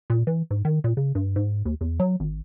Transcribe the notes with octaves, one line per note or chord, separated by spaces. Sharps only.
A#2
E3
G#2
D#3
A#2
C#3
G2
G#2
D#2
E2
F#3
G#1